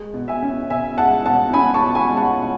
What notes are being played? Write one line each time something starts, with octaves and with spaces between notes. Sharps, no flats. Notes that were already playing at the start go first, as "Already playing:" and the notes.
Already playing: G#3
B2
E5 G#5
C#4
B2 E5 G#5
G#3 F#5 A5
B2 F#5 A5
C#4 G#5 B5
A5 C#6
B2
G#5 B5
G#3
F#5 A5
B2